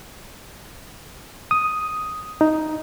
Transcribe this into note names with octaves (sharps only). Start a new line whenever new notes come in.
D#6
D#4